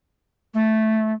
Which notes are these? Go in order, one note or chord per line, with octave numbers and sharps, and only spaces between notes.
A3